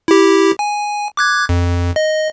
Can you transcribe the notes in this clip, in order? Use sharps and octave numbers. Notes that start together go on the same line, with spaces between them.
E4 G4
G#5
D6 F#6 G#6
F2
D#5